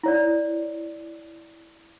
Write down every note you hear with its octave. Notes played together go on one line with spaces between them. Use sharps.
E4 C#5 D5